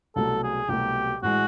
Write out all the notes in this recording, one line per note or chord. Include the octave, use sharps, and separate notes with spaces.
C2 B2 F#3 A3 A4
G#4
C2 B2 F#3 A3 G4
A1 E3 G#3 F#4